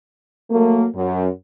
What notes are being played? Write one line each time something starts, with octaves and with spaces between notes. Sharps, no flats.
F#3 A3 A#3
F#2